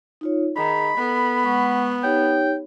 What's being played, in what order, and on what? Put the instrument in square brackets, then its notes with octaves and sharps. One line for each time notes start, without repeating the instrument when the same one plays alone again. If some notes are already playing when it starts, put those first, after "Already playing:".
[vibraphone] D#4 F4 C#5
[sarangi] D#3 [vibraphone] G#4 [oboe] B5
[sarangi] B3 [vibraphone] A4
[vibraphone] G#3 F#5 C#6
[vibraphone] D#4 G4 C#5 [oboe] G5